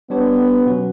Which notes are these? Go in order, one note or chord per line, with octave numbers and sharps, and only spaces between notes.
G3 B3 D4 G4 C#5
B2 F#3 C#4 F#4 B4